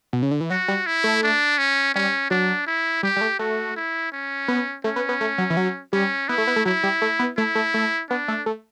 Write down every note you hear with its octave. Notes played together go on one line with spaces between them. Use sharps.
B2
C#3
D3
E3
F#3 F#4
G3
E4
A3
D4
C#4
G3 C#4
F#3 D4
E4
G3 G4
G3
A3
A3 F#4
E4
C#4
B3
A3 C#4
B3
B3
A3
F#3
E3
F#3
G3 C#4
B3 E4
A3
B3
A3
F#3 E4
G3
A3
B3
A3 E4
A3
A3
B3 D4
A3
A3